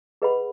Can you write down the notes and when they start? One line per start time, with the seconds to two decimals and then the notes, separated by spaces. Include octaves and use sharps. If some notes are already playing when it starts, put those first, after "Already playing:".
0.22 G#4 B4 D#5 F#5 B5